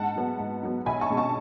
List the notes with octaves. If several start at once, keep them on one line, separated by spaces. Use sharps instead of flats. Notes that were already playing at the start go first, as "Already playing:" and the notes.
Already playing: G#2 F#5 A5
F#3 B3
G#2
F#3 B3
B1 G#5 B5
A5 C#6
B2 G#3 C#4
A5 C#6